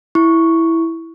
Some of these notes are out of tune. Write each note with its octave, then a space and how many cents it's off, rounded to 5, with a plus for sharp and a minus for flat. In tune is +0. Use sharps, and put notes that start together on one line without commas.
E4 +0 C#6 +0